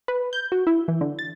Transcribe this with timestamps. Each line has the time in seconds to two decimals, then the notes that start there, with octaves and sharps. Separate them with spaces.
0.08 B4
0.33 G6
0.52 F#4
0.67 E4
0.88 E3
1.01 D3
1.19 A6